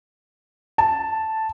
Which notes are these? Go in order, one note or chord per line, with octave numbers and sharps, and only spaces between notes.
A5